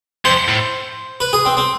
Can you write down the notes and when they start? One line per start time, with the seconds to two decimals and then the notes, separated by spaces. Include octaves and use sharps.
0.25 F2 C5
0.48 A2
1.20 B4
1.33 G#4
1.45 C4
1.57 C4